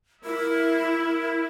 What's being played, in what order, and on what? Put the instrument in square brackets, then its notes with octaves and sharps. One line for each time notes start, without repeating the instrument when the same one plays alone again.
[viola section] E4 [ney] A#4